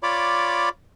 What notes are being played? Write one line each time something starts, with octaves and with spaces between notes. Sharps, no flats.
F4 C#5 D5 B5 D6